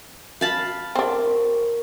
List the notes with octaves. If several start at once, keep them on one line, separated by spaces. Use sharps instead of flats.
F5 A5 B5
C4 D4 A#4
F#4